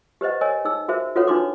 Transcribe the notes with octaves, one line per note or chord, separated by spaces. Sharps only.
G4 B4 C5 D#5 F#5
A#4 C#5 D#5 G#5
D#4 G#4 E6
F#4 G#4 A#4 C5 E5
F4 F#4 A4 B4 C#5 F#5
D4 D#4 F#4 B4 C6 D6